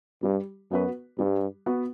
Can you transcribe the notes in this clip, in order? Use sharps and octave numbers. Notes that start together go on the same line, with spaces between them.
G2 G3
F#2 B3 F#4 B4
G2 G3
B3 F#4 B4